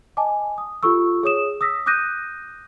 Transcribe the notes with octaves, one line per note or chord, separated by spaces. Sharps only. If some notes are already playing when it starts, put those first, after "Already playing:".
D#5 G#5 A5 D6
D#6
F4 G4 A4 C#6 E6
G#4 C#5 D#6 E7
D#6 E6 A#6 B6
D6 D#6 F#6 G6 A#6 D#7